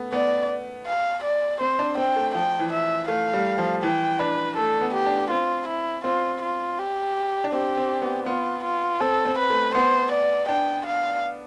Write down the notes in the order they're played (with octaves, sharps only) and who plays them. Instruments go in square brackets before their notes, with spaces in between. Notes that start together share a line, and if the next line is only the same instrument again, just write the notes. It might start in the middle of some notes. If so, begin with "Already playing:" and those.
Already playing: [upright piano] A3 B3
[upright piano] B3 [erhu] D5
[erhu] F5
D5
[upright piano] C4 [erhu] C5
[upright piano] D4
[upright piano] C4 [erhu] G5
[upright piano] A3
[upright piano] F3 [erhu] G5
[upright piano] E3
[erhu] E5
[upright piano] A3 [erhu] F5
[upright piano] G3
F3
[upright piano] E3 [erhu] G5
[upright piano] D4 [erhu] B4
[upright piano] A3 [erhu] A4
[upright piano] B3
[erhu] G4
[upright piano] D4
[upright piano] C4 [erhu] F4
[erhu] E4
[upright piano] C4 [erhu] F4
[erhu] F4
G4
[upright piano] D4
[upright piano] C4 [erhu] G4
[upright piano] C4
B3
[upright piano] B3 [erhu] F4
[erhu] F4
[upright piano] C4 [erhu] A4
[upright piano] C4
[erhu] B4
[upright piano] A3
[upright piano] B3 [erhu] C5
[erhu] D5
[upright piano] D4 [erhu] G5
[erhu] F5